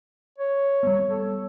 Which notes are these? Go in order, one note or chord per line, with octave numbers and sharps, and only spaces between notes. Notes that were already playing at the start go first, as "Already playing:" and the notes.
C#5
G3 A3 B3
A4